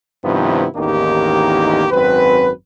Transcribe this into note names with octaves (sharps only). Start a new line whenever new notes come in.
G2 C3 D#3 F3 B3 E4
A1 E2 D#3 A#3 D#4 G4
G#1 F#2 C4 B4